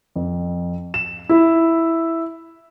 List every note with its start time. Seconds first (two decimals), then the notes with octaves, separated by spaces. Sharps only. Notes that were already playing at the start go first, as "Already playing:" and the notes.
0.16 F2
0.94 E7
1.29 E4